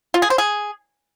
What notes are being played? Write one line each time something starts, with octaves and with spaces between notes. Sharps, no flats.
F4
G#4
C5
G#4